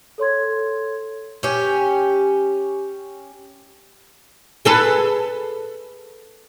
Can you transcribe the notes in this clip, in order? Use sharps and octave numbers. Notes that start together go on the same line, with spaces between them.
A4 C#5 C6 G#6
C#4 G4
G#4 A4 B4